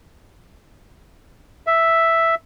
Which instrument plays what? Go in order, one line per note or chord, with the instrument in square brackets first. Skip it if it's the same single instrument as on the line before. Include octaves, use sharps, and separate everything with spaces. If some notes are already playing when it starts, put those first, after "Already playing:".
[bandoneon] E5